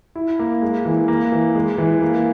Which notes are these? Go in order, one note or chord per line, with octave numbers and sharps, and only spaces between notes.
E4
A#3
G#3
E3
A#3
E3
G#3
E3
A#3